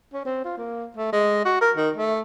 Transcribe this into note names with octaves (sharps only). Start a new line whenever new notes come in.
C#4
C4
F4
A#3
A3
G#3
F#4
A#4
D#3
A3